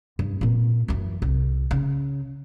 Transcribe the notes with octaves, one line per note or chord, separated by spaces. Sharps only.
G2
A#2 C4
F#2 E3
C2
C#3